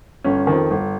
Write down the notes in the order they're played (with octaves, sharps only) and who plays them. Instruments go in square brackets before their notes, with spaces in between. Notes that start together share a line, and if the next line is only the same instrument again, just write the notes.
[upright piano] G1 C#4
F2 D#3
G1